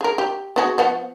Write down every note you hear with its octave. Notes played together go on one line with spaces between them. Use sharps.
G#4 A#4
G4
B3 F#4 G#4
F3 B3 F#5